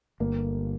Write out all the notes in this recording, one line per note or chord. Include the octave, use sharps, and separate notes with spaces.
G1 A#3